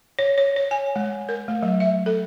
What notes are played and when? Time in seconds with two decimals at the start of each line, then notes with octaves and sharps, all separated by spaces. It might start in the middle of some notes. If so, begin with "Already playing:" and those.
0.19 C#5
0.38 C#5
0.56 C#5
0.71 G#5
0.96 G#3
1.29 A#4
1.48 A3
1.63 F#3
1.80 E5
2.06 A4